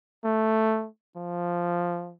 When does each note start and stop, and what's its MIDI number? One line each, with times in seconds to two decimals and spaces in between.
0.24 0.87 57
1.16 2.14 53